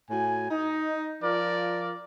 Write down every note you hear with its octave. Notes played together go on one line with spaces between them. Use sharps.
A2 F#4 G#5
D#4
F3 F4 A#4 D5